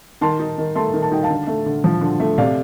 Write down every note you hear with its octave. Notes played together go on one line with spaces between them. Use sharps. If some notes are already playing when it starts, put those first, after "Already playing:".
D#3 A5 C6
D#4
D#3
A3 A5 C6
D#3
A5
D#4 G5
F5 A5
D3
A3
D3
F3
D3
A3
C3 D5 F5